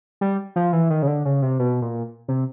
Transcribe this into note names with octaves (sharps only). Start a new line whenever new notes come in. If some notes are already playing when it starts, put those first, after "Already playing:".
G3
F3
E3
D#3
C#3
D3
C#3
C3
B2
A#2
C3